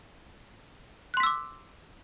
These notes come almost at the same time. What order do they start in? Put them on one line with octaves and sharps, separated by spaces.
F#6 C6 B6 E6 D6